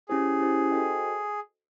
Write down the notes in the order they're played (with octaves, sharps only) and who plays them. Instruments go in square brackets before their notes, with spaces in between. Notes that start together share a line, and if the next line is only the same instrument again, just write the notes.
[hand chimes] C#4 E4 G4 C5 [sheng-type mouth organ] G#4
[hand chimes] C#4 E4 G4 C5
F#4 A4 C5 D#5 G5